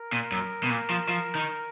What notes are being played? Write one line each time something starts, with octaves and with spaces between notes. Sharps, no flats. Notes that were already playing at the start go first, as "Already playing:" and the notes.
Already playing: A#4
A#2
F#2
B2
A#2
F3
F3
D#3